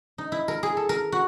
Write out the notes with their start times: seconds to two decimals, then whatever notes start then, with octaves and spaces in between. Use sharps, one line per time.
0.18 D#4
0.32 E4
0.48 A#4
0.63 G#4
0.77 A4
0.89 A#4
1.12 F#4